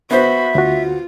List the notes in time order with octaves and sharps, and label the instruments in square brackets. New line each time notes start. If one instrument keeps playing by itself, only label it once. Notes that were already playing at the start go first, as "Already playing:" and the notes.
[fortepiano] B3 C5 [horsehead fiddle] F#4 B5 [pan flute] E5
[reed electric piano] D2 F#4 [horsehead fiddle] F4